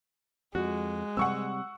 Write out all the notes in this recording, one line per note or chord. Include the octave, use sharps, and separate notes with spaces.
F2 G#3 F#4
C3 G3 C4 F#5 C#6 E6